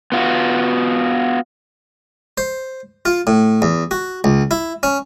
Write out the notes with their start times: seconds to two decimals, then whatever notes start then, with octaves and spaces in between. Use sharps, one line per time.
0.12 B3 F4 F#4
2.38 C5
3.05 F4
3.27 A2
3.62 E2
3.91 F#4
4.24 C#2
4.51 E4
4.83 C#4